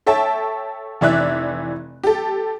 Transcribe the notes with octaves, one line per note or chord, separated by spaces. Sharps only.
A4 C#5 E5 G5 A5
F1 E3 D5 E5 F#6
G4 A4